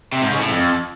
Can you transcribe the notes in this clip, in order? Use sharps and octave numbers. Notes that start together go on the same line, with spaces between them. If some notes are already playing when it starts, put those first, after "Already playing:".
C3
G#2
C#3
A2
F2